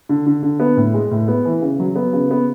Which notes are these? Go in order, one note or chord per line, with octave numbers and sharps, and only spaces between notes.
D3
D3
D3
B3
A2
G#3
A2
B3
E3
C#3
F#3
B3
C#3
B3